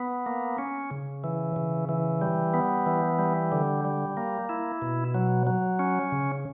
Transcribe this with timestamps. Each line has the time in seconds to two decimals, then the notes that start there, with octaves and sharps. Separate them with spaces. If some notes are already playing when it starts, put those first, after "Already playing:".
Already playing: B3
0.26 A#3
0.58 C#4
0.91 C#3
1.24 E3
1.56 C#3
1.89 E3
2.22 G3
2.54 B3
2.86 E3
3.19 G3
3.52 D3
3.85 G3
4.17 A#3
4.49 E4
4.82 B2
5.14 F#3
5.47 F#3
5.79 C#4
6.12 C#3